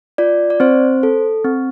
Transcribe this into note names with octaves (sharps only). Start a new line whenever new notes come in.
F4 D5
D5
C4 C5
A4
C4